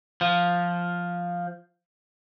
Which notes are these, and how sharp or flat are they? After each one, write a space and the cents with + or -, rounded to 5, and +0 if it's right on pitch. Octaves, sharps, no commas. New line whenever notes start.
F3 +5